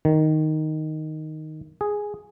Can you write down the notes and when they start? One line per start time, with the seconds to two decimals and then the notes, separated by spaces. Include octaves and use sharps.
0.05 D#3
1.81 G#4